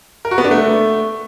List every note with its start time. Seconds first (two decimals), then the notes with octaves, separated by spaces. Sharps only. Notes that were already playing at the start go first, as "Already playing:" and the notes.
0.25 A#4
0.31 F#4
0.38 B3
0.44 D4
0.51 A3